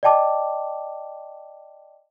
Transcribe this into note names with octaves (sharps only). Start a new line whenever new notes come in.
D5 D#5 G5 A5 D6